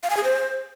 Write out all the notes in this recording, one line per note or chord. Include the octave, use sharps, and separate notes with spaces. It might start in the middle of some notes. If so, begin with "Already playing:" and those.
F5
G#5
G#4
C5